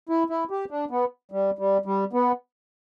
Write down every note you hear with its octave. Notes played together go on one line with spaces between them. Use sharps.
E4
E4
G4
D4
B3
G3
G3
G3
B3